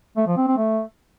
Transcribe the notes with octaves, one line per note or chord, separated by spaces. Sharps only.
A3
F3
C4
C4
A3